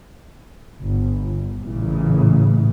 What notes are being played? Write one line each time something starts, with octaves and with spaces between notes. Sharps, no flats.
G1
A1 A#2 C#3 E3